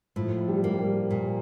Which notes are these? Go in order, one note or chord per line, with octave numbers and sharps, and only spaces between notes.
A2 F3
G3
A#3
G3
A#2